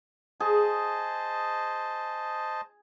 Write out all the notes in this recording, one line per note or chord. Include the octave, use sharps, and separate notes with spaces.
G#4 C5 D#5 A5